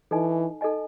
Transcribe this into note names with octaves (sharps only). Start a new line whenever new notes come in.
E3 D#4 A4 D#5 G#5
D#4 A4 D#5 G#5